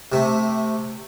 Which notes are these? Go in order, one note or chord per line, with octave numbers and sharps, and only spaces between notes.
C3 A3